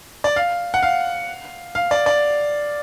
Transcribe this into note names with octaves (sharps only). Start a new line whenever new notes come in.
D5
F5
F#5
F5
F5
D5
D5